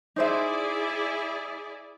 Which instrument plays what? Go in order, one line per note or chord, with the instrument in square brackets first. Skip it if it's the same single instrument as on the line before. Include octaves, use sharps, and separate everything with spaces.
[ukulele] D#4 C5 E5 [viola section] E4 G#4 D5